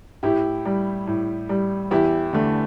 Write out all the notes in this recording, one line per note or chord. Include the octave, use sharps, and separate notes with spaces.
A2 E4 G4
G3
A2
G3
E2 E4 G4
D3 A3